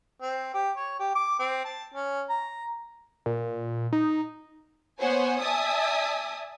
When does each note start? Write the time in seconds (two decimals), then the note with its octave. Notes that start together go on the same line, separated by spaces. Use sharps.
0.22 C4
0.54 G4
0.76 C#5
1.00 G4
1.15 D6
1.39 C4
1.65 A5
1.94 C#4
2.29 A#5
3.26 A#2
3.93 D#4
4.99 B3 C5 C#5 F#5 G#5
5.40 D5 E5 G#5 A5 D#6